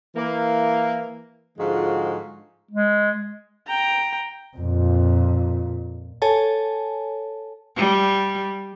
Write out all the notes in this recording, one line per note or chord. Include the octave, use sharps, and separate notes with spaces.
E3 A#3
G#2 D3 F3 G#3 F4 F#4
G#3
G5 A#5
F2 A#2
A4 C#5 G#5 A5
G3